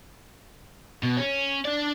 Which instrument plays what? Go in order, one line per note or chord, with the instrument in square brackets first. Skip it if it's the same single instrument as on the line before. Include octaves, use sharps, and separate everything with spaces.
[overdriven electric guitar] B2
C#4
D4 D5